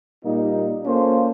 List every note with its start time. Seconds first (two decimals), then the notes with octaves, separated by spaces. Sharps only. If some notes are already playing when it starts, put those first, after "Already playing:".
0.24 A#2 G3 A#3 D#4
0.84 A#3 C#4 F4 A4 C5